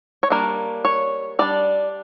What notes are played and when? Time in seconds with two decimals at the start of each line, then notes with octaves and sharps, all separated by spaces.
0.23 C#5
0.30 G3 A#3 D4 A#4
0.85 C#5
1.39 G3 D4 D5